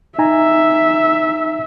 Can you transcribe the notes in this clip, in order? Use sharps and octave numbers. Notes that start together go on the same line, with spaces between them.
D#4 E5 G#5 A#5